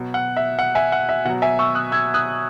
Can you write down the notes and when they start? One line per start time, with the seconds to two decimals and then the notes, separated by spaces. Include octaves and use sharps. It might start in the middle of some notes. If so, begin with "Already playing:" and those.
Already playing: B2 F#3
0.14 F#5
0.37 E5
0.59 F#5
0.75 E5 G#5
0.92 F#5
1.09 E5
1.25 B2 F#5
1.29 F#3
1.42 E5 G#5
1.59 C#6 E6
1.75 D#6 F#6
1.92 E6 G#6
2.14 D#6 F#6